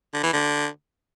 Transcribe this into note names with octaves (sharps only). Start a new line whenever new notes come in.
D3
E3
D3